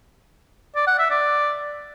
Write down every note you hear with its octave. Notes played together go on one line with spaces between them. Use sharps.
D5
F#5
E5
D5